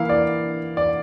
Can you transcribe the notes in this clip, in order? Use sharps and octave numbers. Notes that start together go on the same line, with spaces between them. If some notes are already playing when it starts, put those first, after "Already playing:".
Already playing: E3 A#3 E4 F5
D5
D5